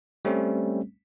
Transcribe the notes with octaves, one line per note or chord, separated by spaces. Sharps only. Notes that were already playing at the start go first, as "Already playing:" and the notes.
G3 A3 C4 C#4